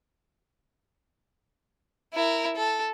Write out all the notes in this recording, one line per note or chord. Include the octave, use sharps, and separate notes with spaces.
E4 A#4
A4